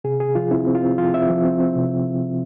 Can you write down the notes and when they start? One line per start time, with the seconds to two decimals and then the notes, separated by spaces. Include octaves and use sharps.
0.04 C3 G#4
0.20 C3 G#4
0.35 F3 F4
0.51 C4 E4
0.67 C4
0.75 F4
0.82 C4
0.98 F3 F4
1.14 C4 E5
1.30 F3
1.45 C4
1.60 C4
1.76 C3